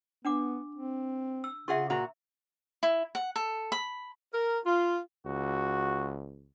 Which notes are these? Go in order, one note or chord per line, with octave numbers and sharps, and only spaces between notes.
B3 D4 F#5 D6
C4
E6
C#3 F4 G#4 E5 F#5 C#6
A#2 F#4 A#5
E4
F#5
A4
B5
A#4
F4
C#2 F#4